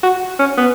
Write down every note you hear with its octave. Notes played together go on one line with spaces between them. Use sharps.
F#4
C#4
B3